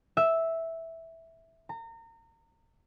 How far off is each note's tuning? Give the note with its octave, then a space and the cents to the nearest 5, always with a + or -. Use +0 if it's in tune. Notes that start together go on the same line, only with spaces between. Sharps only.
E5 -5
A#5 -30